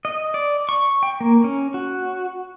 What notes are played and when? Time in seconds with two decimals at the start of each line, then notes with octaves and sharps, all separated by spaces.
0.05 D#5
0.34 D5
0.69 C#6
1.03 G5
1.21 A#3
1.44 C#4
1.74 F#4